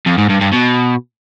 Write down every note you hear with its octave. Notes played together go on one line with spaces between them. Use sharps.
F2
G#2
G2
G2
B2